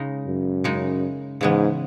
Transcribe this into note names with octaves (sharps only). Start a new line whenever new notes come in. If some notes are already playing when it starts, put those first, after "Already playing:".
Already playing: C#3 G#3 D#4
F#2
C#3 G#3 D#4
G#2 C#3 E3 G#3 B3